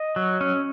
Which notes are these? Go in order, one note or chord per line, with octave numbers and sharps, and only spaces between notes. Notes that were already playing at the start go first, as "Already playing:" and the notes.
Already playing: D#5
F#3
C#4